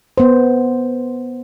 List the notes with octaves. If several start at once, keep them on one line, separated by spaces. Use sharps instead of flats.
B3 C5